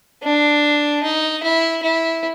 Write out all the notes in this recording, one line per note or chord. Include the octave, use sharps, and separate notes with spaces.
D4
D#4
E4
E4